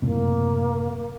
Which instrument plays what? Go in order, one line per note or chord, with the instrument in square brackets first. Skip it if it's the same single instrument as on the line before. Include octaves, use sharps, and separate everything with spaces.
[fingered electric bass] F#1 A2 C3 [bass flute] A#3